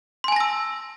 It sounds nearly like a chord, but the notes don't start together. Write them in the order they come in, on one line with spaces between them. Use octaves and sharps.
C6 G#5 A5 A#6 E6